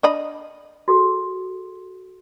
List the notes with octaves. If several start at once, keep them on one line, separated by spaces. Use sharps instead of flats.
D4 D#5 B5
F#4 G#4 A4